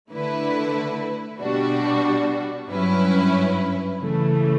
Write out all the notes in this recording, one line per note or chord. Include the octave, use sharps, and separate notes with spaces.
D3 A3 E4 B4
B2 G3 D4 F#4
G2 F#3 C#4 E4 B4
C#3 E3 A3